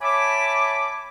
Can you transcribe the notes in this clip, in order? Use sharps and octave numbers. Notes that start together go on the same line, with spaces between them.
C#5 E5 G#5 A5 B5 D6